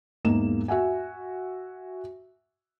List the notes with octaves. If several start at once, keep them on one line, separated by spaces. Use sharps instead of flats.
E2 G#2 A#3 D#4 E7
F#4 E5 F#5 G#5